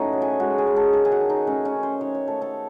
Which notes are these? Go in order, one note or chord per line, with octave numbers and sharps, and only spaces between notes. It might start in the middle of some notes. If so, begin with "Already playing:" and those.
Already playing: A2 A3 C#4 D#4 F#4
F#3
G#4
G#3 F#4
G#4
G#3
A4
D#3 A4
G#4
F#4
D#3
D#4
A3 C#4
C#4
D#3
C5
D#3 C#5
C#5
A3 A4
A4